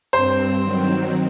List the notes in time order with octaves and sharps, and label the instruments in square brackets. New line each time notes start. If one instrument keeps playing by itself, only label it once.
[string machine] G2 C4 [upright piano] C5
[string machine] D#3 F#3 C4